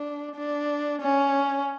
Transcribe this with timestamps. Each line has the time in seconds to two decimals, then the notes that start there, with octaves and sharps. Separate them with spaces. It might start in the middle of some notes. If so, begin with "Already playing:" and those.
Already playing: D4
0.35 D4
1.02 C#4